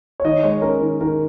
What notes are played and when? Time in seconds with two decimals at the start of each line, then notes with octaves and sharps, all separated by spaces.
0.20 C#5
0.24 D#3 D#5
0.43 G#3 C#5
0.62 C#4 A#4
0.81 D#3
1.01 D#3 A#4